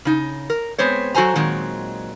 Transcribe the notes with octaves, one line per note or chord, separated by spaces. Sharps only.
C#3 D#4
A#4
G#3 B3 C4 C5 C#5
F#3 F#4 A4 C5 G#5 A#5
A#2 D#3 F#3 G#3 C4